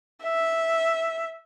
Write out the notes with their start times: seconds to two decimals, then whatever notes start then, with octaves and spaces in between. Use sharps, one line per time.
0.23 E5